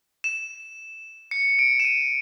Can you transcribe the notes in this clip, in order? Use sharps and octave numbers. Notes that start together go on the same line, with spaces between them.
E7
C#7
D7
E7
D#7